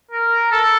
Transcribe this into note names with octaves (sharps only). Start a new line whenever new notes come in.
A#4
A4